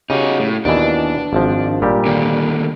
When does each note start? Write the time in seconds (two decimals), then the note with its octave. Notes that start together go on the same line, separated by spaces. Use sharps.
0.10 C#3 D#4 F#4 G4
0.40 A2
0.65 D#2 B2 E3 D4
1.33 G#1 F3
1.82 A#2 G3 G4
2.06 D#2 D3